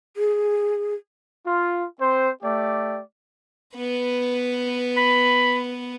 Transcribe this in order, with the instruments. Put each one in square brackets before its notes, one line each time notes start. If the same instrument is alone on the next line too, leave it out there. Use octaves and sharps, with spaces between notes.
[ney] G#4
[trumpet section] F4
C4 C5
A3 G4 D5
[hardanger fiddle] B3 B4
[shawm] B5